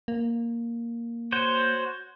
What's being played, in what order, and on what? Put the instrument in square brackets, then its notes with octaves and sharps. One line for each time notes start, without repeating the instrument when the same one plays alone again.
[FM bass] A#3
[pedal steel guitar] F#4 C5 C#5